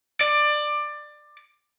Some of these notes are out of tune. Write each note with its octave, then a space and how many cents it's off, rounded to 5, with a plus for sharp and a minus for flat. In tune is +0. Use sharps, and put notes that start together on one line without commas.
D5 +20